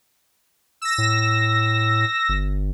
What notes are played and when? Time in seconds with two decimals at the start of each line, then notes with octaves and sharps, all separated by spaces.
0.82 E6 A#6
0.98 A2
2.29 G1